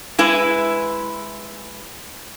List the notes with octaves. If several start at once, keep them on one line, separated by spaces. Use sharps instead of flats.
G#3 E4 B4